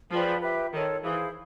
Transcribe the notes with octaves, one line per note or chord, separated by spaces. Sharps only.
F3 G#4 B4 D5 G5
G4 B4 E5 G5
D#3 F4 A4 C#5
E3 E4 G#4 C5 F5